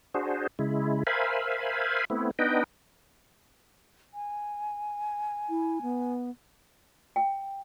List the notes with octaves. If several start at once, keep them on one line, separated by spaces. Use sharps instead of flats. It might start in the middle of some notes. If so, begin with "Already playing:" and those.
D4 F#4 G#4 C5
C#3 G#3 E4
A#4 C5 E5 F5 G#5 B5
A3 B3 C4 E4
B3 D4 D#4 B4 D#5 G5
G#5
E4
B3
G5